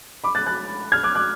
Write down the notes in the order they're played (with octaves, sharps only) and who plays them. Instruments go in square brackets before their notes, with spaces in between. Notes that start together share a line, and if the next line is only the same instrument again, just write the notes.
[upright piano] B5 D6
F#6 A6
F#6 A6
F6 G#6
D6 F#6
D6 F#6